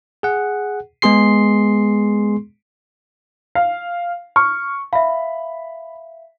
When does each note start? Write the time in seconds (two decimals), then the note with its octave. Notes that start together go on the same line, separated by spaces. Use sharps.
0.23 G#4 F#5
1.02 G#3 B3 G#4 C6 C7
3.55 F5
4.36 C#6 F6
4.93 E5 F5 B5